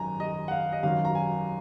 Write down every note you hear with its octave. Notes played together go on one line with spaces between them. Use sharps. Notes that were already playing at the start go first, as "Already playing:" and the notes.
Already playing: G#1 F#2 D#3 G#5 A#5
D#5
F#5
F5
D#5
G#1 F#2 D#3 F#3 F5
A#5
G#5